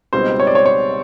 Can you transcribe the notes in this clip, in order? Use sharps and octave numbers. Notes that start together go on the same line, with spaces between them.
C#2 B2 G3 C4 D#4 C5
C#5
D5
C#5
C#5